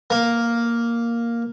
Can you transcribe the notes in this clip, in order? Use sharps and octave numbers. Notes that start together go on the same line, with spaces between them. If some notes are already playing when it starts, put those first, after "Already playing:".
A#3